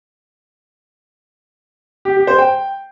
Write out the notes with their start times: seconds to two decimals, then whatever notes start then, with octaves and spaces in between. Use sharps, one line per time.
2.05 G4
2.16 G4
2.27 C5
2.38 G5